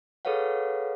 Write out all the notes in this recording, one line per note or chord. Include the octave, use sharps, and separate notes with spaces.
G#4 A4 B4 C#5 F5 F#5